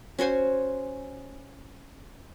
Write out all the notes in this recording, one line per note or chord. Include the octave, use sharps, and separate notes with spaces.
C#4 F#4 C5 G#5